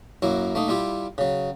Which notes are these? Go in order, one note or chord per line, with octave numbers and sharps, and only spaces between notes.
F#2 F#3 A#3 E4
A3 A#3 D#4
G3 E4 F4 G4
C#3 F#3